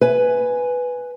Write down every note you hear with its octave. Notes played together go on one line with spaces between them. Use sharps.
B4 G#5